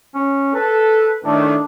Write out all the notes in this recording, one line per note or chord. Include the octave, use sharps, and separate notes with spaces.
C#4
A4 B4
A2 D#3 A3 D4